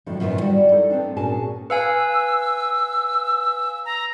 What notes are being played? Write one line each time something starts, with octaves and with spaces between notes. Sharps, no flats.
F2 A2 D3 F3 F#3
F#2 A#2 D#3 B3 E4
G3 E4 F#4 D5 F#5
D#4 A4
B3 C4 D4
A#2 C#4 F#4 G#4 G#5 A5
B4 F5 G#5 E6
A#5